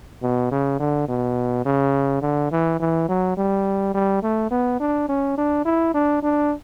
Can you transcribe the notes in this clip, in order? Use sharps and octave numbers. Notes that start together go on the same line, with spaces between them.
B2
C#3
D3
B2
C#3
D3
E3
E3
F#3
G3
G3
A3
B3
D4
C#4
D4
E4
D4
D4